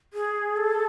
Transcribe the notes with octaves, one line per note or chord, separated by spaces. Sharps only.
G#4
A4